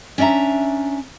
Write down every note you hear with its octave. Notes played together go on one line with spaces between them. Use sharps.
C#4 D4 D5 E5 A#5